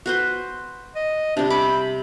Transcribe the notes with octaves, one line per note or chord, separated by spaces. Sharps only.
F#4 B4 C5
D#5
C3 G3 D4
B5 D6